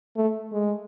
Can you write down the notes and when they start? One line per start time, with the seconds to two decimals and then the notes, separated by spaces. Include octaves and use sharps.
0.17 A3
0.52 G#3